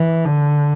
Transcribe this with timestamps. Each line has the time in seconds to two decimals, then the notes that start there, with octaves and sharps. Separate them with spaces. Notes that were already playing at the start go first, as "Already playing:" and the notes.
Already playing: E3
0.25 D3